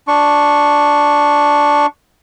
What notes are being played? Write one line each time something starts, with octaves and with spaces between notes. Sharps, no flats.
D4 C#6